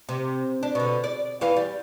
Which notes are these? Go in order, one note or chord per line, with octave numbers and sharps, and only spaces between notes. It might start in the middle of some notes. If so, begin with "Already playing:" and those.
C3
D4
B2 D3
D5
E2 E3 F5
G3